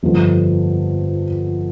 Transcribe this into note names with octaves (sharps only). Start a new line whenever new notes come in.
G1 F2 D3